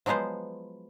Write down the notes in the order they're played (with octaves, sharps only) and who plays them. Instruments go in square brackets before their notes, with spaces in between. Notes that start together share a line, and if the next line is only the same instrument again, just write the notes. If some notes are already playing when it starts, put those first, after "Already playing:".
[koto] F3 F#3 G#3 B3 C5